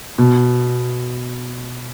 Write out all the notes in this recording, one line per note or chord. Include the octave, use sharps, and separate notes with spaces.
B2